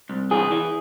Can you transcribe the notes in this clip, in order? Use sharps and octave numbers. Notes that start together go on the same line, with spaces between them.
C2
E3 G#4
E3